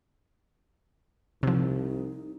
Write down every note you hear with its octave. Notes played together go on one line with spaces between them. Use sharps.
C2 C3 F3 D#4